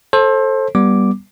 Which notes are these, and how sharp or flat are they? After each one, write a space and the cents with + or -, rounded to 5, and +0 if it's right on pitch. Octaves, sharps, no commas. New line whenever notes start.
A4 +0 C5 +30
G3 -5 B3 -25 D6 +0